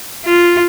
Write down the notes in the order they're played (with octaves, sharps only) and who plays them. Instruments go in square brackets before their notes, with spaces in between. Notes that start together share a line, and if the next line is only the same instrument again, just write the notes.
[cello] F4